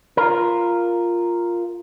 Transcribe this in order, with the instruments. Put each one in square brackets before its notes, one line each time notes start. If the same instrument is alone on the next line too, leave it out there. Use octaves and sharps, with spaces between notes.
[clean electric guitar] F4 A#4